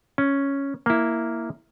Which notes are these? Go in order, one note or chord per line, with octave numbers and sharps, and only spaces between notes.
C#4
A#3 E4